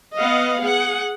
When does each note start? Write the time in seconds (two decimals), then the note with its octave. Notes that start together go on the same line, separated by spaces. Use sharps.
0.18 B3 D#5 F5 F#5
0.60 G#4 F#5